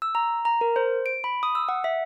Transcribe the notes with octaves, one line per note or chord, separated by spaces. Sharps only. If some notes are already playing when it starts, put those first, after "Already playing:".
E6
A#5
A#5
A#4
C5
D7
B5
D#6
E6
F#5
E5